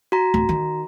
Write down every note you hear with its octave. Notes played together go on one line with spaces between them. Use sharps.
F#4 A#5
D1
D#3